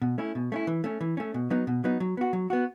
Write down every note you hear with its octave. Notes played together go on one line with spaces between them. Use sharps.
B2
A3 C#4 E4
B2
A3 C#4 E4
E3
A3 C#4
E3
A3 C#4
B2
F#3 B3 D#4
B2
F#3 B3 D#4
F#3
B3 F#4
F#3
B3 F#4